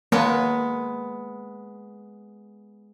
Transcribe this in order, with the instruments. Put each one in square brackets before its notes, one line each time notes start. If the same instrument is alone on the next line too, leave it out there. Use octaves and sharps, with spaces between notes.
[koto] G#3 B3 [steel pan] A#3